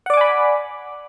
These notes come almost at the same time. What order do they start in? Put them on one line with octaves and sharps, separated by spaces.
F#5 D5 D6 G#5 B5